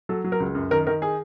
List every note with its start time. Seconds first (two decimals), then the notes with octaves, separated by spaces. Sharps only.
0.09 F#3 A4
0.24 F#3
0.32 A#4
0.40 C#2
0.55 F#2
0.71 D#3 A#4
0.87 D#3 A#4
1.02 G#4